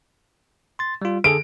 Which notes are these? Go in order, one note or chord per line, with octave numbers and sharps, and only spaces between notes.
C6 A6
G3 F4
D3 G#4 A4 D7